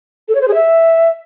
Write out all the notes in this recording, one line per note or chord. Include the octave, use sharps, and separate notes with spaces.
A4
C#5
C5
G#4
E5